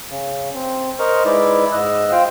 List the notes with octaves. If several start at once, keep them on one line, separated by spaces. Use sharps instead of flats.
C#3
C4
A#4 C5 D#5 A#5 C#6 F6
G#3 D#4 E4 B4 D5
G#2 D#5 E6 F#6
F4 C5 F5 G5